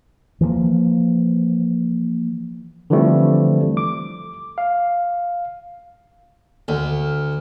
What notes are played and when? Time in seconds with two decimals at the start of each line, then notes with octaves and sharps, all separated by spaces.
0.41 E3 F3 G#3 A#3
2.90 D3 E3 F3 G3 A3 C4
3.77 D6
4.58 F5
6.68 D2